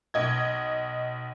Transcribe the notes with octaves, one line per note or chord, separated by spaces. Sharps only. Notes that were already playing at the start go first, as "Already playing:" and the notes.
B1 D#5 G#6